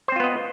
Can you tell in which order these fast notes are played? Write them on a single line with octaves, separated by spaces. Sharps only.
C5 C4 F4 B3 D#5